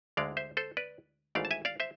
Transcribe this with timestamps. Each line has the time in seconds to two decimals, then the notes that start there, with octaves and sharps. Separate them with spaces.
0.17 D2 D3 G#3 D5 F5
0.37 C5 E5
0.57 A4 C5
0.77 B4 D5
1.35 G#1 G#2 E3 A3 D5 F5
1.45 A5
1.51 E5 G#5
1.65 D5 F5
1.80 C5 E5